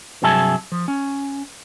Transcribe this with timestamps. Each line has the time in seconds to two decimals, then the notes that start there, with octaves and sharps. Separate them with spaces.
0.22 G2 C3 F#3 G#4 E5 A5
0.72 F3
0.88 C#4